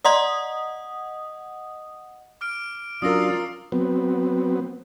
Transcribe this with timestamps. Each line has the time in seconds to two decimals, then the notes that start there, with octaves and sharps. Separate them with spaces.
0.05 D5 D#5 F#5 A#5 C6 D#6
2.41 D6 F6 D7
3.02 F#3 C#4 D4 F4 A#4 D#6 E6 A#6
3.72 F#3 B3 C4